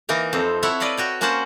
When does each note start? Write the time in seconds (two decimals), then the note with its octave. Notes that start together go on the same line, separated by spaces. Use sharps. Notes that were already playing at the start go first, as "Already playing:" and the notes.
0.09 E3 A#3 D#4 A#4
0.33 F2 A4 C5
0.63 E4 A4 C#5 E5 F#5
0.80 B4 D5 D#5 F5 B5
0.97 F#4 C#5 G5
1.21 A#3 C#4 F#4 C5 F#5 A5